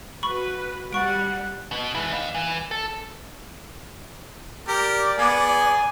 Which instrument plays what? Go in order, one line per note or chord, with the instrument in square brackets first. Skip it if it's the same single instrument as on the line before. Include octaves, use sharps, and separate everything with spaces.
[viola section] F#4 B4 [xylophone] B5 C#6
[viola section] G3 [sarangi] F#5 [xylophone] C#6 D7
[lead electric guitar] B2
G#3 E4
D#5 F5
E3
A4
[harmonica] G4 A#4 [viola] D5
[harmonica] B3 G#4 [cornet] G#5